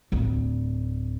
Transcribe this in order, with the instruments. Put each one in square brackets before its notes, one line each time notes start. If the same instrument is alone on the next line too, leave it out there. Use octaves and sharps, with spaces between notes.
[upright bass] D1 D2